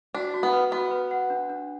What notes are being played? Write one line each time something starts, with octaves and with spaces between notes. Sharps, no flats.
D4 F#4
F#4
B3
B4
B3 F#4
B4
F#5
D4
D4